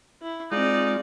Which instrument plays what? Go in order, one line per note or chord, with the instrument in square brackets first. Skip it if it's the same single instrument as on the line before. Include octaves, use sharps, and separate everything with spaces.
[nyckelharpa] E4
[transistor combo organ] G#3 F4 [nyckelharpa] C4 D5 [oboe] D#4